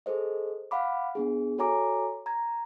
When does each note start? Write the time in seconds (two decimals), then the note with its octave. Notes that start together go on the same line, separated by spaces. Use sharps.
0.06 G#4 A4 C5 D#5
0.71 F5 F#5 B5 D6
1.15 B3 D4 G#4
1.58 F#4 A4 C#5 G#5 A#5 D6
2.26 A#5 G#6